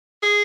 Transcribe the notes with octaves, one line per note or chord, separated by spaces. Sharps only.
G#4